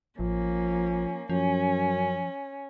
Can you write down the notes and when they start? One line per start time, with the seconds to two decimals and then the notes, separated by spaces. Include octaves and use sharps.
0.19 A1 F3 A#3 C#4
1.30 F#2 F3 C#4